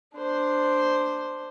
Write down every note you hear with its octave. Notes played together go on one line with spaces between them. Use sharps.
D4 C5